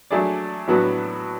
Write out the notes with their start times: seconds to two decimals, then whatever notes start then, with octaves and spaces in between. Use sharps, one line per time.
0.11 F#3 A3 D4 G#4 D5
0.67 A2 F#3 B3 D4 F#4